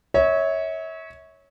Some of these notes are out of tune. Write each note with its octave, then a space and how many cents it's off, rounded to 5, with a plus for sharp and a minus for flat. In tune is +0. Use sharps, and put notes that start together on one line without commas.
C#5 +0 E5 -35